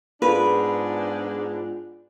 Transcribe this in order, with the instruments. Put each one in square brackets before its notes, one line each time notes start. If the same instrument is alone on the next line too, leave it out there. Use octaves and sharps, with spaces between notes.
[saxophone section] G#2 B3 D4 [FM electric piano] F4 G#4 [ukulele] B4